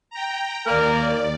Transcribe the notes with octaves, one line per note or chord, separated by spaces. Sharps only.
G5 A#5
D#2 A#3 A#4 D5